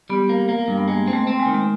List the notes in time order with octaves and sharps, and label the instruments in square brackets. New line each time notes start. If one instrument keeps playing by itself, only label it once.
[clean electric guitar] G3 [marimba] B3
[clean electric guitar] A#3
A#3
G2
[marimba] B3
[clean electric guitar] G#3 [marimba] A#3
[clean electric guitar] C4
[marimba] A3
[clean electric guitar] C4
[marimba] G#3
[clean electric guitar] D#3
[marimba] G#3